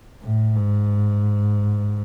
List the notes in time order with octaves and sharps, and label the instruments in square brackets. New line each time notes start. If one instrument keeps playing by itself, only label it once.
[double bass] A2
G#2